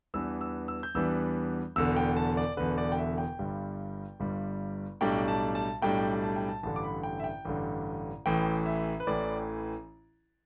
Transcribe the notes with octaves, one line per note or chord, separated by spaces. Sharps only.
E2 E3 G3 B3 D4 E6
E6
E6
G6
E2 E3 G3 B3 D4 E6
E1 E2 D3 E6
G5
A5
D5
E1 E2 D3 B4
D5
G5
E5
G5
G1 G2 G3
G1 G2 G3
B1 A2 G3 D4 G5
A5
A5
B1 A2 G3 D4 G5
A5
G5
A5
A1 G2 D3 A5
D6
B5
G5
E5
G5
A1 G2 D3
A1 A2 E3 G5
E5
B4
A1 A2 E3 D5